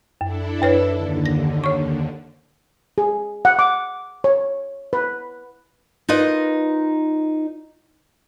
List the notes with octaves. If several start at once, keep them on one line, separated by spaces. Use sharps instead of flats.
F#2 D4 E4 A4
F#2 B4 C#5
D#2 D3
A#6
C#5 C#6
G#4
F#5
D6
C#5
B4
D#4 F4 A#4 B4 D#5